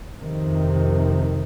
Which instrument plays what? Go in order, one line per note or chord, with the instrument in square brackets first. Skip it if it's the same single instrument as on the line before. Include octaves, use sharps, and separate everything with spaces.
[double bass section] F2 C3 D#3